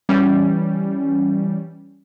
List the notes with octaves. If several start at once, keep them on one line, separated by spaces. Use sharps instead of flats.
E3 G3 C#4